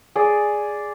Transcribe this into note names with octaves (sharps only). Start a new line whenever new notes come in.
G#4 D5